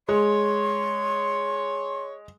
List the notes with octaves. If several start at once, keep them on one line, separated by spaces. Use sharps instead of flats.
G#3 C#5 C6